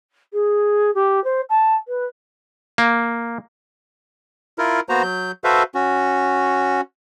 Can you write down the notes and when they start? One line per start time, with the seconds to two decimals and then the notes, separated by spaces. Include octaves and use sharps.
0.33 G#4
0.95 G4
1.24 C5
1.50 A5
1.88 B4
2.78 A#3
4.58 E4 F4 A#4
4.89 A#3 B3 F#4 C5 A#5
5.03 F#3 G6
5.44 F#4 A4 B4 C5 E5 F5
5.75 C#4 F#4